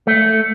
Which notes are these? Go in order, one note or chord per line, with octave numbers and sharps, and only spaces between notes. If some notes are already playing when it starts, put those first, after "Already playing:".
A3